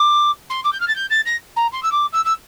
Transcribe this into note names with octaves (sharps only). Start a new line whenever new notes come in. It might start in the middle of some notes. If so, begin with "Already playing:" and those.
Already playing: D6
C6
D6
G6
F6
A6
G6
A6
A#6
A#5
C6
E6
D6
E6
E6